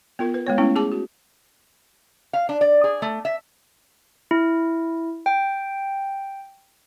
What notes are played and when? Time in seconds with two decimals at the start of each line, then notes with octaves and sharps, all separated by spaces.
0.19 B3 F4 A#4
0.34 B4
0.47 G#3 B3 C#5
0.58 A3 B3 C#4 E4
0.76 G#4 A5 D6
0.92 F#4
2.33 F5
2.49 D4
2.61 D5
2.84 G#4
3.02 A3
3.25 E5
4.31 E4
5.26 G5